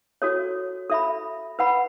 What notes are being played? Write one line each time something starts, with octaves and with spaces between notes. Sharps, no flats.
F#4 A4 C#5
A4 E5 B5
B4 F#5 B5